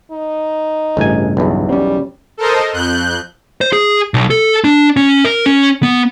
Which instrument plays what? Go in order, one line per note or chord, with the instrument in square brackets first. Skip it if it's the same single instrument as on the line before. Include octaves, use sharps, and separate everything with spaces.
[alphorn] D#4
[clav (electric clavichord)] A1 G#5 [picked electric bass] G2 C#3
[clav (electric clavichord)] B1 E2
[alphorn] G3 [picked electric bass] C4 C#4
[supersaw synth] A4 A#4 C5 D#5
F2 F#6 G6
[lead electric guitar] C5
G#4
B1
A4
D4
C#4
A#4
C#4
B3